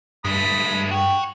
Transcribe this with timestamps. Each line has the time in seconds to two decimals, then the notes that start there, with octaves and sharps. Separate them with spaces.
0.25 G2 G#3 A3 B5 D#6
0.91 F#4 C#5 G5